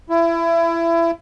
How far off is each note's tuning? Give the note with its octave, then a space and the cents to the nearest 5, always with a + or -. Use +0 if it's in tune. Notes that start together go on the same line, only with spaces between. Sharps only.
E4 +25